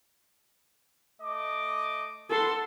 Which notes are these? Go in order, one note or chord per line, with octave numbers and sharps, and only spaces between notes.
A3 D#5 D6
B3 A4 F#5 C6